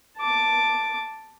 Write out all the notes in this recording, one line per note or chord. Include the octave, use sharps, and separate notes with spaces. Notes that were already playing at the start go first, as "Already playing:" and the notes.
A5 D6